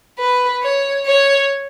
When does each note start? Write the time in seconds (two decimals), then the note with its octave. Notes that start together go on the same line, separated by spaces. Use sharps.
0.19 B4
0.62 C#5
1.06 C#5